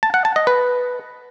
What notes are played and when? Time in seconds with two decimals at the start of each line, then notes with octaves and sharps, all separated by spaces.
0.03 A5
0.14 F#5
0.25 A5
0.36 D#5
0.47 B4